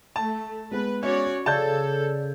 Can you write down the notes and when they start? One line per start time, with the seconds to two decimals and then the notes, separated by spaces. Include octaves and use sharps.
0.16 A3 A5
0.71 G#3 B3 B4
1.03 C#4 F#4 C#5 D5
1.46 C#3 A4 D5 A5 G6 G#6